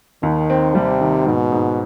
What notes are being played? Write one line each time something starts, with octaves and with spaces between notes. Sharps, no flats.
D#2 D#3
C4
C3 G3
D#3
G#2 B2
G#2